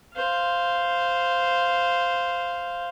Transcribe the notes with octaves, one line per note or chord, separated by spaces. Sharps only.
C5 F5